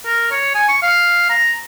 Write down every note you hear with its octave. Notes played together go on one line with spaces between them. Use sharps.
A#4
C#5
G#5
C#6
F5
A#5